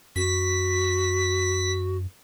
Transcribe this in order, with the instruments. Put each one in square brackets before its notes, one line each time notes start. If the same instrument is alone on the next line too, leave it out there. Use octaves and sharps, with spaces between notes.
[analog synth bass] F#2 [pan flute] F#4 [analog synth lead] B6